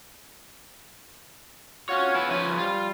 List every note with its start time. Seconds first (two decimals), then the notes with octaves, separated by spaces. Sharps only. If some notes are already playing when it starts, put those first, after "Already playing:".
1.89 C#4 F4 F#4 C#5
2.14 B3 E4
2.31 F3 C#4 B4 G#5
2.58 G3 F4